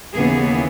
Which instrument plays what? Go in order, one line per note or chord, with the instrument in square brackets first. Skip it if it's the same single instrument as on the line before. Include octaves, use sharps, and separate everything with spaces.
[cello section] D#2 C#3 E3 B3 G#4